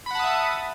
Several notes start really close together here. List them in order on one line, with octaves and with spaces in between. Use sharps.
B5 F#5 A5 D#6 E5